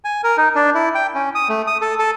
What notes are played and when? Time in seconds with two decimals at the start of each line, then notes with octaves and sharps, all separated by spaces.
0.05 G#5
0.24 A#4
0.37 D#4
0.55 D4
0.75 E4
0.95 G5
1.14 C#4
1.35 D#6
1.49 A3
1.67 D#6
1.82 A4
1.99 A4